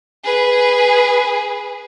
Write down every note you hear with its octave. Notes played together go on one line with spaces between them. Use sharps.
G#4 B4